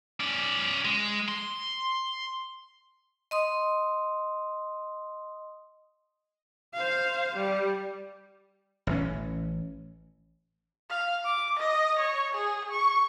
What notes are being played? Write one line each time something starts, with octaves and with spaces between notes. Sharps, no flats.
C#4 D5
G#3
C6
D#5 C6 D#6
C5 F5
G3
A1 E3 C#4
F5
D6
D#5
C#5
G#4
C#6